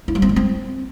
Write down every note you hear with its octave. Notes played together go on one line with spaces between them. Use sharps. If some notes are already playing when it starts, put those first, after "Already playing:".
E4
G3
C4
G#3
C4